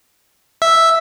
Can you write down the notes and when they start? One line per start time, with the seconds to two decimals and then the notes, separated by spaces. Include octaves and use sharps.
0.62 E5